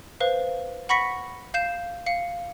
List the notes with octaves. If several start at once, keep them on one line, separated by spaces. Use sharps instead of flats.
B4 C5 F5
F#5 B5 C#6 A#6 B6 C#7
F5 G6 C7 E7
F5 C#7